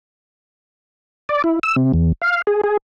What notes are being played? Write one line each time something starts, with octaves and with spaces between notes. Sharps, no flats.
D5
E4
E6
C3
E2
F5
G#4
G#4